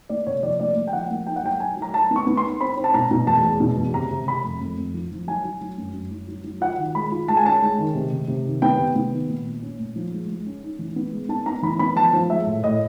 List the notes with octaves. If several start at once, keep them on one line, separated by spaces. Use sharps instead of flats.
A#3 D5
C3 C#5
F3 D5
A#3 D5
A#3
G5
F3 F#5
A#3
D#4 G5
F#5
F#3 G5
F#3 G#5
F#3
A#5
F#3 A5
B3
C#6
B3
C6
D#4
C4 B5
C4
A5
B2 A#5
B2
E2 A5
E2
B2
E2
C3 A#5
C3
C3 B5
F2
F2
F2
F3
F3
F#3 G#5
F#3
F#3
F#2
F#2
F#3
F#3
F#3
F4 F#5
D#3
G#3 B5
F4
G#3 A5
G#5
C#4 A5
G#3
D#3
C3
C3
C3
D#3
B3 G5
C3
B3
D#3
A#2
A#2
C#4
A#2
F3
G#3
G#3
C#4
D#4
E3
B3
G#3
B3 A5
B3 A#5
E3 B5
B3 B5
F3 A5
F3
G#3 E5
A2
A2 D#5